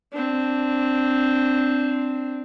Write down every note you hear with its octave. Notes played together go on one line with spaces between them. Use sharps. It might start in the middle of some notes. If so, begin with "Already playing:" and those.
C4 D4